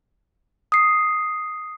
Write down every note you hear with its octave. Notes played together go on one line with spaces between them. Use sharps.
D#6 C7